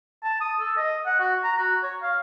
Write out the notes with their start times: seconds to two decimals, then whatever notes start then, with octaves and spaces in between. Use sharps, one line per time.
0.24 A5
0.41 D#6
0.60 A4
0.77 D#5
1.06 F#5
1.20 F#4
1.44 A#5
1.58 F#4
1.83 C#5
2.03 F5